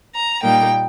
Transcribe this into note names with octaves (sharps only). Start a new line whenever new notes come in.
A#5
A#2 G3 A#3 D#4 G5